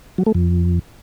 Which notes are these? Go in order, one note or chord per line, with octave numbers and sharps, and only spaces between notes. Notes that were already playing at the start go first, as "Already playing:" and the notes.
F#3
A3
F2